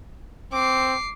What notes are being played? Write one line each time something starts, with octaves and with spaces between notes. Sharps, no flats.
C4 D6 C7